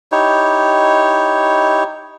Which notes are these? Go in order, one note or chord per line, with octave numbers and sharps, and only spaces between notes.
D#4 E4 G4 C#5